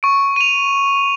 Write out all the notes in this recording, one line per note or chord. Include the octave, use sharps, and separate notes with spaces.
C#6 D7
D#7 F7